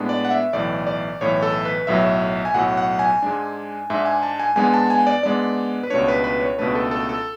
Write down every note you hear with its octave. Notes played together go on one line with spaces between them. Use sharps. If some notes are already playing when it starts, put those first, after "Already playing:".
Already playing: A2 G#3 B3 D4
D5
F#5
E5
B1 A2 E3 D5
D5
B1 A2 E3 C#5
A4
B4
B1 A2 F#3 E5
G#5
B1 A2 F#3 F#5
F#5
G#5
G#2 G#3 D4
G#2 G#3 D4 E5
G#5
A5
G#5
G#2 G#3 B3 D4 G#5
A5
G#5
D5
G#2 G#3 B3 D4 D5
B4
C#2 B2 A3 D4 C#5
B4
B4
C#5
C#2 B2 A3 D4 B4
A4
A4
A4